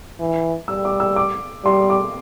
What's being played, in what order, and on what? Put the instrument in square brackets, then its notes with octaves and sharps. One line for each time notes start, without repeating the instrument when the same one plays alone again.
[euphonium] E3
[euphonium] G3 [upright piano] E6
[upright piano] D6
E6
D6
[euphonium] G3 [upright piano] C6
[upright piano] D6